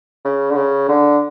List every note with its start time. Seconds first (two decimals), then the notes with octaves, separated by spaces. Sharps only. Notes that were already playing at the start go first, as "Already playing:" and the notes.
0.25 C#3
0.51 D3
0.56 C#3
0.89 D3